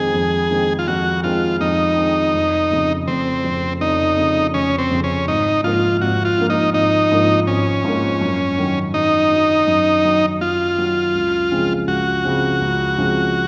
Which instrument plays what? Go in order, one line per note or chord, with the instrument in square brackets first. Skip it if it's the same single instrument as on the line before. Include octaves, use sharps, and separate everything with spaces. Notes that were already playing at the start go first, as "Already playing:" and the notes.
Already playing: [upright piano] F2 D#3 G#3 C4 [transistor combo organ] G#4
[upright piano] F2
D#3 G#3 C4
[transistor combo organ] F4
[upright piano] F2 [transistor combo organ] F#4
[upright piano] D#3 G#3 C4 [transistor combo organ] F4
[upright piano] F2 [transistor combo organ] D#4
[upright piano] D#3 G#3 C4
F1
F2 C#3
[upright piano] F1 [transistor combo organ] C4
[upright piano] F2 C#3
[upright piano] F1 [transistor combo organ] D#4
[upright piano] F2 C#3
[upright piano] F1 [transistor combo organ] C#4
[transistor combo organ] C4
[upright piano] F2 C#3
[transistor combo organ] C#4
[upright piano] G#1 [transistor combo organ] D#4
[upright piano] G#2 F3 A#3 [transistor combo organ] F4
[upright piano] G#1 [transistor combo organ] F#4
[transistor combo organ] F4
[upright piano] G#2 F3 A#3
[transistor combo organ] D#4
[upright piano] G#1 [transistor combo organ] D#4
[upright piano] G#2 F3 A#3
[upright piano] G#1 [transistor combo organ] C#4
[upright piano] G#2 F3 A#3
F#2
D#3 F#3
[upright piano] F#2 [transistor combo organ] D#4
[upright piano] D#3 F#3
F#2
D#3 F#3
[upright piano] F#2 [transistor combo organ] F4
[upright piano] D#3 F#3
C#2
C#3 F3 G#3 C4
[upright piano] C#2 [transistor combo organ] F#4
[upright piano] C#3 F3 G#3 C4
C#2
C#3 F3 G#3 C4